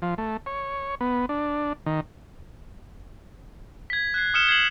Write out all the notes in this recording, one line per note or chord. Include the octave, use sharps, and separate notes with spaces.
F3
A3
C#5
B3
D4
D#3
G#6 B6
F#6 G#6 C7
D#6 F6 C#7 E7 G7
G#6 C7 F#7